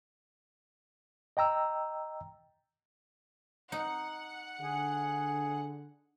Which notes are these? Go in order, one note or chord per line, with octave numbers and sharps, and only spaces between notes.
D#5 G5 A#5 E6
D#4 F#5
D3 G#4